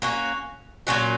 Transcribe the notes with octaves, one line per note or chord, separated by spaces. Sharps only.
A#3 C#4 F#4
A#2 F#3 C#4 F#4